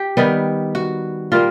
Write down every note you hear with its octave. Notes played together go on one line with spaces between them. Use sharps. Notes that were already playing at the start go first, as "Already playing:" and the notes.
Already playing: G4
D#3 G3 B3
F#4
A#2 G3 A#3 F4